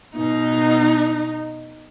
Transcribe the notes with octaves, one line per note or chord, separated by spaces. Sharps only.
B2 D#4